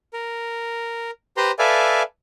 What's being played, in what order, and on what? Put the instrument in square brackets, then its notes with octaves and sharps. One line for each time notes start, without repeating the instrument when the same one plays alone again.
[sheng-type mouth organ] A#4
G4 B4 C5 A#5 C6
A4 B4 D5 E5 F5 G#5